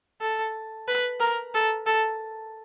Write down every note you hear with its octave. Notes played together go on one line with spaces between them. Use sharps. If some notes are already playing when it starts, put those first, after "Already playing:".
A4
B4
A#4
A4
A4